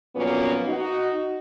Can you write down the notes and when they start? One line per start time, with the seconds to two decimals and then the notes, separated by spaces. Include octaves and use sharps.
0.15 F2 A#2 F#3 A#3 B3 C#4
0.66 D#4 F#4